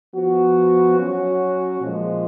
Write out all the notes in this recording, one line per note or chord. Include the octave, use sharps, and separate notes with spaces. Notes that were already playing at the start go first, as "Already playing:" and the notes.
F3 B3 F#4
F#3 C#4 F#4
A#2 F3 G#3